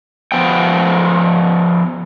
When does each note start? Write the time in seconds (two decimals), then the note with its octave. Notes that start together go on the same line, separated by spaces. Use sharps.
0.32 F3 B3 G5